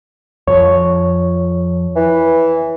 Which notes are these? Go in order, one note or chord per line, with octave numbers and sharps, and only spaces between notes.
F2 F3 C#5
E3